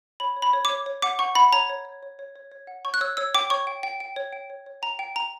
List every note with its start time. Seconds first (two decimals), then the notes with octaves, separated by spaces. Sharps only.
0.20 C#5 B5
0.36 C#5
0.42 B5
0.53 C#5
0.65 D6
0.70 C#5
0.86 C#5
1.02 F#5 D6
1.19 F#5 C#6
1.35 F#5 B5
1.53 C#5 A#5
1.69 C#5
1.85 C#5
2.03 C#5
2.19 C#5
2.36 C#5
2.52 C#5
2.67 F#5
2.85 C#5 C#6
2.94 F#6
3.01 C#5 E6
3.17 C#5 E6
3.35 G5 D6
3.50 C#5 C#6
3.67 G5
3.83 G5
4.00 G5
4.16 C#5
4.33 G5
4.50 C#5
4.66 C#5
4.82 G5 A#5
4.99 G5
5.15 G5 A#5